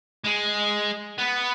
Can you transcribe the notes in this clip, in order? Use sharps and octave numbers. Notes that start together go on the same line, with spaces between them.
G#3
B3